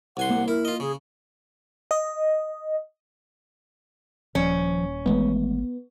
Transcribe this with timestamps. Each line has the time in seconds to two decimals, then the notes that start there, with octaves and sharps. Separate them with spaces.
0.17 C2 F#5 G#5 C6
0.30 A#3
0.48 E4 A#4
0.65 F4 D#5
0.80 C#3 G#4
1.91 D#5
4.35 D#1 F3 C#4
5.06 G#1 E3 G#3 A3 B3